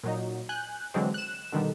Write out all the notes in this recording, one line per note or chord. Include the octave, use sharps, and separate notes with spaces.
A#2 F#3 D#4
G#5 F#6 G6
D3 E3 F#3 G#3 C4
F#6 E7
B2 D3 D#3 G3